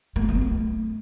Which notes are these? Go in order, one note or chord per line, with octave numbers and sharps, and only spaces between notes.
A#3
A3
A#3
B3
A3